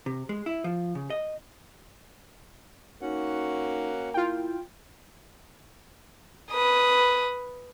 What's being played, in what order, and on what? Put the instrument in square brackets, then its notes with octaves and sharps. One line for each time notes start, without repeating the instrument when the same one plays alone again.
[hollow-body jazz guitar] C3
G#3
E4
F3
C#3
D#5
[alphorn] A#3 [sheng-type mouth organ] C#4 F#4 F#5 [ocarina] D#4
[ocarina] E4 [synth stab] F4 G5
[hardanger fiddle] B4 D#6